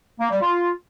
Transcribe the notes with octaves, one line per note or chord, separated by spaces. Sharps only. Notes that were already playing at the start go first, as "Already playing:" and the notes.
A#3
G3
F4